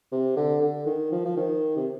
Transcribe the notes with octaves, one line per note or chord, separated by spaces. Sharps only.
C3
D3
D3
D#3
F3
F3
D#3
C3